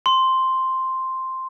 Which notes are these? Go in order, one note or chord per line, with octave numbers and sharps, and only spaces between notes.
C6